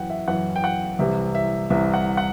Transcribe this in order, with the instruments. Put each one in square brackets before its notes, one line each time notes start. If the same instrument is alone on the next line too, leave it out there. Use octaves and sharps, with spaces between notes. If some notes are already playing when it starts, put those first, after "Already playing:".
Already playing: [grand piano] F#2 E3 F#5 G5
E5
F#2 E3 F#5
G5
F#5
C2 C3 E3 E5
E5
C2 C3 E3 E5
F#5
F#5